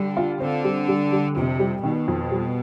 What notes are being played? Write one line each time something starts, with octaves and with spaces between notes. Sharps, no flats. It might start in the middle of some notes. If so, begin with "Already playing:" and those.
Already playing: D3 G3
F4
D3 C4
G3
G3
G3
F2 C3
G3
B2 D#3
F2
G3